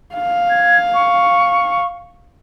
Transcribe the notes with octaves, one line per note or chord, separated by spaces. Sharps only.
F5
G#6
C#6